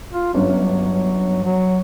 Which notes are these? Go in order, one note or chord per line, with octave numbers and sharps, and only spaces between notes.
F4
G1 F#3 C#4 D4
F#3